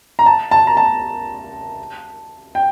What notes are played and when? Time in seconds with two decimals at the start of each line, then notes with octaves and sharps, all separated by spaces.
0.19 A#5
0.26 A5
0.51 A5
0.67 A#5
0.77 A5
2.55 G5